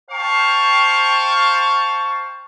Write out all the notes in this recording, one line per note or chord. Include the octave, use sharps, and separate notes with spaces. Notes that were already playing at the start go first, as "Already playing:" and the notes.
C5 F5 G5 A5 C#6